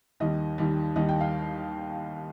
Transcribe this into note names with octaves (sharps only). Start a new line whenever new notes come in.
D#2 D#3 G3 D#5
D#2 D#3 G3
D#2 D#3 G3 D#5
G5
F5